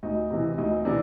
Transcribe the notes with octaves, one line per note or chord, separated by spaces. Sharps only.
D2 D#4
C3 E3
D2 D#4
C3 E3 D4